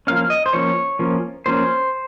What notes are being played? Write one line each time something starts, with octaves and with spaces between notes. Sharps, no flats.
F3 A#3 C#4 F5
D#5
C5
F3 A#3 C#4 C#5
F3 A#3 C#4
F3 A#3 C#4 C5